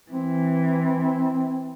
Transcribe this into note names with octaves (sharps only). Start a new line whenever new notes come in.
E3 C4